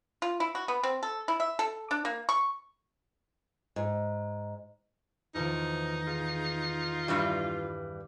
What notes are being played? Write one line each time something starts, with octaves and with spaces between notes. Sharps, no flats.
F4
E4
F#4
B3
C4
A4
E4
E5
A4
D4
A#3
C#6
G#2
E2 A2 D#3 F3 D#4
F4 G#4
G2 E3 G3